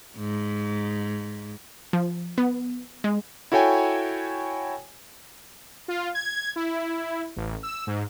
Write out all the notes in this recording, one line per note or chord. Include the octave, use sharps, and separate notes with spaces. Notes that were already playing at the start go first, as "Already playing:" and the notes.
G#2
F3
B3
G#3
E4 F#4 A4 C#5 G5 G#5
F4
G#6
E4
A1
E6
G#2